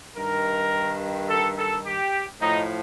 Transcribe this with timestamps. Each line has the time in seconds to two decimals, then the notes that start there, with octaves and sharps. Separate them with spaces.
0.15 G2 D#3 A#4
1.28 A4
1.56 A4
1.85 G4
2.41 A2 F3 D#4